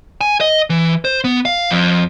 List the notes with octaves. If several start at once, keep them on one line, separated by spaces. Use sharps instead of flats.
G#5
D#5
E3
C5
B3
F5
F2